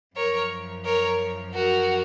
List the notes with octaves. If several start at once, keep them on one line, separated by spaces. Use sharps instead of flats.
F#2 A#4 C#5
F3
A#4 C#5
F#4 A#4